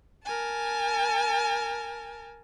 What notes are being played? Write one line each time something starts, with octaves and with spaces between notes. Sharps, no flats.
A#4 G#5 A5